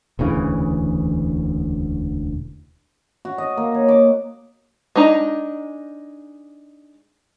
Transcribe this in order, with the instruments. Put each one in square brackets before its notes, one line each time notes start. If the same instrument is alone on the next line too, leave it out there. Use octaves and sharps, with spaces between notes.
[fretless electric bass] E1 D2 C#3 E3
[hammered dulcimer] F#4
D#5
A#3
C#5
D6
[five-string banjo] G#3 D4 D#4 A#5